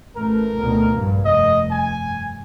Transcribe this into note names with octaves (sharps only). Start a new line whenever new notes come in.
A1 A3 A#4
D2 B2 D#3
A#1 G2 A#3
F1 G2 D#5
G#5